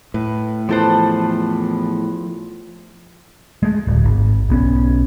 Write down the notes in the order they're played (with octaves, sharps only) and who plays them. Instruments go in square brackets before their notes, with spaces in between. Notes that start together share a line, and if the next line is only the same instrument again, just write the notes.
[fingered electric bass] A2 [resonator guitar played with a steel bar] B4
[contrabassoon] E2 [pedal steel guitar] F3 B4 [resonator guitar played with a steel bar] G4 A4 C5
[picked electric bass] G#3 A3
D1
G#1
B1 B3 C#4